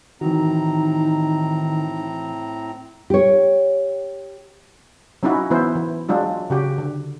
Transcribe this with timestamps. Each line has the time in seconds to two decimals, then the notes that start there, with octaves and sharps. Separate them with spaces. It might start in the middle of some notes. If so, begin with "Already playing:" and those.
0.21 A2 D#3 E3 C4 D#4 F#4 A#5
3.10 G4 C#5
5.23 F#3 C#4 D#4 E4 F#4
5.50 E3 B3 E4 C5
5.75 E3
6.09 F#3 G#3 D4 F4
6.50 C#3 F#4 G4
6.78 D3